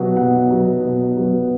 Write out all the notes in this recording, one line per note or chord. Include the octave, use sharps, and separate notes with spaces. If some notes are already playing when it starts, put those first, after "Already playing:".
Already playing: B2 F#3 B3 F#5
B2 F#5
F#3 B3
B2
F#3 B3